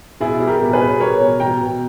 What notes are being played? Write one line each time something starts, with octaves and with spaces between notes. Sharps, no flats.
B2 E4 G#4
G3
G4 A#4
B2
G#4 B4
B2
G3 A#4 C#5
B2
B2 G5 A#5
B2